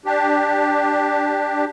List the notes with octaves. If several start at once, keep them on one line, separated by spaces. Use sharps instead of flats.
D4 G4